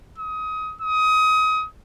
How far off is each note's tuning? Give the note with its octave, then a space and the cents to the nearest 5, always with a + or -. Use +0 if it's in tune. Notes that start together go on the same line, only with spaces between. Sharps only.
D#6 +25
D#6 +25